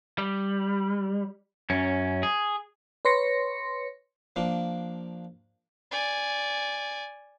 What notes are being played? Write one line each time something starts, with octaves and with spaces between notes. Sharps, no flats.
G3
F#2 C#4
G#4
B4 C#5 C6 A#6 C#7
F3 A#3 D4
D5 G#5